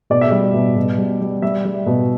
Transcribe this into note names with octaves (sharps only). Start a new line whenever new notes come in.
B2 D5
E5
G3 D5
B2
B2
G3
G3
G3 E5
G3
B2